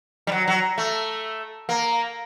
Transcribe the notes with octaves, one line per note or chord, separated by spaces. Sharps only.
G3
F#3
F#3
A3
A#3